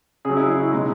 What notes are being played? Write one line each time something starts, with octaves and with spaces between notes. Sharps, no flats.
C#3 F#3 G#4
E4
E4
E4
B2 G#3 D#4